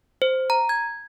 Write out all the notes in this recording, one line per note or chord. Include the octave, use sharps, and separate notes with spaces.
C5
A#5
G#6